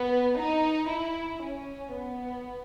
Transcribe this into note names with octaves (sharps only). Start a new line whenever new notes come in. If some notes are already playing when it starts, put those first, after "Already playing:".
Already playing: B3
D#4
E4
C#4
B3